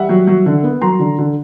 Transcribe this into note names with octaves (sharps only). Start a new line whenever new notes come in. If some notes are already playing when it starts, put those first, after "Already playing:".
Already playing: G3 E5 F#5
F#3
F#3
D3
B3
F#3 A#5 C6
D3
D3